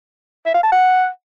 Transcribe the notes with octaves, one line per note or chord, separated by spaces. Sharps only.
E5
F5
A5
F#5